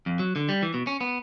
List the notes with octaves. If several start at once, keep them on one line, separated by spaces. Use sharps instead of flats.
F2
F#3
D3
G3
E3
B2
C#4
B3